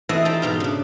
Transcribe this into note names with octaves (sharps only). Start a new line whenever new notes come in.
E3 C4 E4 F#4 A4 D#5
C4 D#4 G4 D5 A5
G#2 B2 F4
C#3 D4